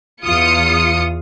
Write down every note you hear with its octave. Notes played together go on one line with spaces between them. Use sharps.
E2 F4 D#6 C#7